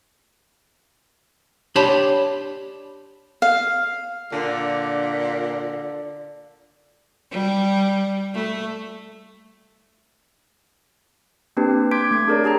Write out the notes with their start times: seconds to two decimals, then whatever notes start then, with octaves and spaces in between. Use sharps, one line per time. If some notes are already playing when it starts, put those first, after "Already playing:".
1.75 D4 G4 C#5 A5 B5 C6
3.42 F5
4.32 A#2 D3
7.31 G3
8.34 A3
11.57 A#3 C4 D4 G4 B4
11.91 C6 D6 G6 G#6 B6 D7
12.11 A3 G#6 D7
12.27 D4 G#4 A#4 C#5 D5
12.44 G4 G#4 A5 A#5